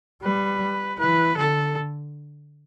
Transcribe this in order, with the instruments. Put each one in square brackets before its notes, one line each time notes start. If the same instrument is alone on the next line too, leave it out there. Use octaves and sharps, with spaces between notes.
[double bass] G3 [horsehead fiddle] B4
[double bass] E3 [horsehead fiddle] B4
[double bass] D3 [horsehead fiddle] A4